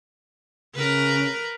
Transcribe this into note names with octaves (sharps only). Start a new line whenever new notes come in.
C#3 A#4 B4